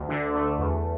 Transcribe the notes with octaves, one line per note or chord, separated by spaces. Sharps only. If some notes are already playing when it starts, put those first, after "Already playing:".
Already playing: D2
D3
A3
E2